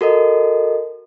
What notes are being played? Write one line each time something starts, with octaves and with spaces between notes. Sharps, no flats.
F#4 A4 A#4 D#5